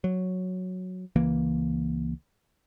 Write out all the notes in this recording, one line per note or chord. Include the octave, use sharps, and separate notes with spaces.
F#3
C#2 E3 A#3